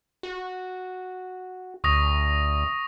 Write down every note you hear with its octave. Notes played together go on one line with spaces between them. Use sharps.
F#4
D2 C#6 D#6 A#6